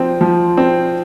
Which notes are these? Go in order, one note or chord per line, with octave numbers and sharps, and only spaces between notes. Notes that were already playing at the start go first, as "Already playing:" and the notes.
Already playing: F3 C4
F3
C4